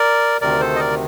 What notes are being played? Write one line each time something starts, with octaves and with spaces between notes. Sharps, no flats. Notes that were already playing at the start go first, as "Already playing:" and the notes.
Already playing: A#4 D5
D2 C3 D#3 A#4 D5
A4 C5
D#5
A#4 D5